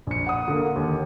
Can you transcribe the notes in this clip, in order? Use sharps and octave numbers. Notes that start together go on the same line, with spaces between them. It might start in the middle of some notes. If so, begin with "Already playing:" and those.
A#1 C#7
F#5 D#6
D3 A#3
D#2